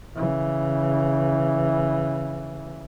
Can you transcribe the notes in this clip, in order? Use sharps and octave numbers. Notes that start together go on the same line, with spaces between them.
C#3 E3